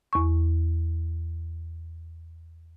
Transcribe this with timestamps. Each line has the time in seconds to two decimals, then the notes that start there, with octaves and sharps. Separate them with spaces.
0.13 E2 C#6